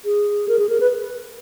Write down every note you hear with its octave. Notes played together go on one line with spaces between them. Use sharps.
G#4
A#4
G#4
A#4
B4